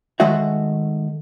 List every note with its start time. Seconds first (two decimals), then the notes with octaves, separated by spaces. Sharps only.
0.20 D#3 G#3 A3 F#4 E5